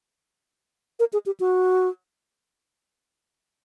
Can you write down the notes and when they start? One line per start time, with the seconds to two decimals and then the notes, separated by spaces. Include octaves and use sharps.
1.00 A#4
1.13 G#4
1.26 G4
1.40 F#4